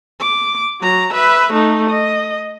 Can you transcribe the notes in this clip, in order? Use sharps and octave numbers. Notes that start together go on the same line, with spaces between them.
D6
F#3 A#5
B4 E5
A3 D#4
D#5